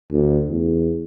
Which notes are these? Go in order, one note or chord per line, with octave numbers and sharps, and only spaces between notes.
D2
E2